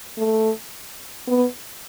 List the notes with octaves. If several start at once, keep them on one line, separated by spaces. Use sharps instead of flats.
A3
B3